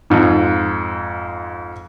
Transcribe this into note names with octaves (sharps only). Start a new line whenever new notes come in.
F2 G#2